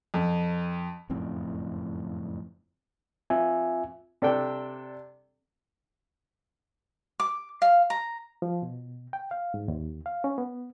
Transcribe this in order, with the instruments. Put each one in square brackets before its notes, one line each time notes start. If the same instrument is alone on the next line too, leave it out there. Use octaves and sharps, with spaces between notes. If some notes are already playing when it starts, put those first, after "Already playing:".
[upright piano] F2
[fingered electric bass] F#1 F2 A2 C4
[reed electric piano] C4 F4 E5 G#5
[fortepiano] C3 D4 A4 D5 G5
[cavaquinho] D6
F5
A#5
[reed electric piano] F3
B2
G5
F5
G#2
D#2
F5
C#4
B3